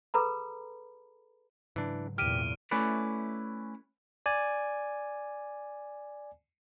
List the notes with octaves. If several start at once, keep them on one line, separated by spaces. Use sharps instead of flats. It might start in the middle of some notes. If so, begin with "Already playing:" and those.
G#4 A4 B4 A#5 B5
G#2 C#3 E3 F#3 D4
E2 A#2 G4 F6 D7 D#7
A3 C#4 E4 B4 D5
D5 G#5